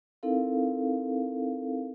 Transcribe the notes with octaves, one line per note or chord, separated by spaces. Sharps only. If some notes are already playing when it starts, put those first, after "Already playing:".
C4 D#4 E4 A4 A#4 F5